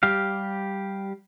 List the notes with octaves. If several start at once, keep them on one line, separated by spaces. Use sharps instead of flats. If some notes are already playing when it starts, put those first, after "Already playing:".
G3 G4 F5